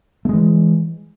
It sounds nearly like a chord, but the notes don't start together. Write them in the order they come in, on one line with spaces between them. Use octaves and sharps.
A3 G#3 E3